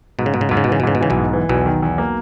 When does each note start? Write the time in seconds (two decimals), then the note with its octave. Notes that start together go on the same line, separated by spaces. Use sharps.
0.19 G#2 B2
0.26 C#3
0.34 G#2 B2
0.41 C#3
0.49 G#2 B2
0.57 C#3
0.64 B2
0.68 C#3 E3
0.80 B2
0.83 G#2 C#3
0.95 B2
1.00 C#3 E3
1.10 B1 B2
1.17 G#2
1.33 E3
1.49 B1 E2 B2
1.66 D#3
1.82 E2
1.98 A#3